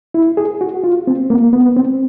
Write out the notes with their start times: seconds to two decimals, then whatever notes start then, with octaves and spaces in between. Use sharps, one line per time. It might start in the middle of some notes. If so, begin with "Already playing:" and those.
0.14 E4
0.37 G#4
0.61 F#4
0.84 F4
1.07 C4
1.30 A#3
1.53 B3
1.77 C4